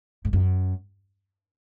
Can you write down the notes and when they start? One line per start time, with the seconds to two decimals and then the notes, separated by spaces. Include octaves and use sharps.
0.25 G#2
0.33 F#2